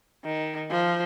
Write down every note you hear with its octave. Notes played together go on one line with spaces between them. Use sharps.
D#3
F3